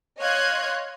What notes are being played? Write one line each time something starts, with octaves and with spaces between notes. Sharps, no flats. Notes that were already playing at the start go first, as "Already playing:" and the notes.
C#5 D#5 F5 C6 F#6 G#6